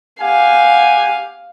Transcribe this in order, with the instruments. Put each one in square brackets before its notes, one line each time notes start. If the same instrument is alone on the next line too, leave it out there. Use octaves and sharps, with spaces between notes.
[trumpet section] G4 F#5 G#5 [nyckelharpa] F5